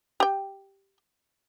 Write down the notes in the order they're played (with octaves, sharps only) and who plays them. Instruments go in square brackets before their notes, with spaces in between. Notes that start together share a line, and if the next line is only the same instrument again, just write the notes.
[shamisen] G4 G5